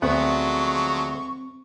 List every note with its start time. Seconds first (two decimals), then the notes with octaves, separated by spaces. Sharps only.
0.02 D2 F3 F#3 G#3 B3 C4 F#5 C#6